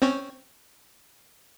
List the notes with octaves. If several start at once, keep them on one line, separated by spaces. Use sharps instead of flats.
C4 C#4 C#5